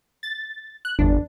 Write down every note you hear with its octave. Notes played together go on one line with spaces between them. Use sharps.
A6
F#6
G1 E2 D4